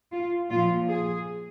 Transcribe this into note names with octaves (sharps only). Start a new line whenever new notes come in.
F4
A#2 F3 F4
G#4